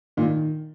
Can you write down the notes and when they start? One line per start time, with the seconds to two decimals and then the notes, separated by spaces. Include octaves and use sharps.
0.17 A#2 D#3